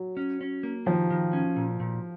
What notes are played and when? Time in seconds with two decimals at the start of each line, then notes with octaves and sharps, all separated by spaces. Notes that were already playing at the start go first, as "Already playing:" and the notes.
Already playing: F#3
0.17 C#4
0.41 C#4
0.63 A#3
0.86 D#3 F3
1.10 D#3
1.33 C#4
1.56 A#2
1.80 A#2